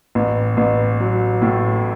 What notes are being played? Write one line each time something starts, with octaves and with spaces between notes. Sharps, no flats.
A1
A1
F#3
A2